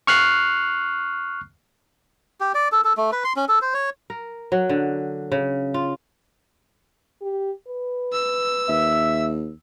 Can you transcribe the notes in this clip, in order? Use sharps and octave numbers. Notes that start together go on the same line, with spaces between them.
C#6 F6 F#6 C7
G4
D5
A4
A4
A3
B4
C6
C#4
A4
C5
C#5
A#4
F#3
D3
C#3
F4
G4
B4
E6
D#2 E5